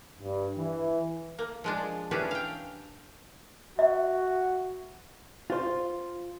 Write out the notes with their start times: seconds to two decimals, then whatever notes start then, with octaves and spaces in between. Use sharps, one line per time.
0.21 G2
0.58 E3
1.39 A#3
1.64 F3 G#3 D4
2.11 E3 C#4 D4 G4 B4
2.31 F5 G5
3.79 F#4 E5
5.50 F4 C5